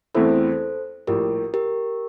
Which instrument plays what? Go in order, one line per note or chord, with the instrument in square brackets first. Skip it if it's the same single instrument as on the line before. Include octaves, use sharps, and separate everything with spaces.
[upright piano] E2 E3 A3 C4 E4 [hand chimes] A4 C5
[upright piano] A#1 A2 G3 [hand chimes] G4 A#4
[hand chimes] G4 A#4